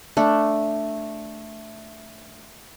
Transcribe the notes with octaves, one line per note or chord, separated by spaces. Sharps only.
A3 D4